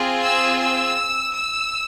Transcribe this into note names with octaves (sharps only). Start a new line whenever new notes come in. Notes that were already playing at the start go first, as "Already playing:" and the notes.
Already playing: C4 F4 G#4
E6
E6
E6